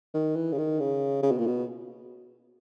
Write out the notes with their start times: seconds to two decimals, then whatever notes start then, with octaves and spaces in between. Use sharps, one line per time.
0.14 D#3
0.36 E3
0.52 C#3
0.58 D#3
0.80 C#3
1.23 C#3
1.31 B2
1.38 A#2
1.47 B2